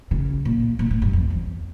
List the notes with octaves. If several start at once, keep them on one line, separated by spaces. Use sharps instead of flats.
C#3
A#2
A#2
A2
G2
F2
E2